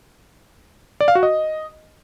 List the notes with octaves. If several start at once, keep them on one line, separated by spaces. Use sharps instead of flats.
D5
F5
F#4
D#5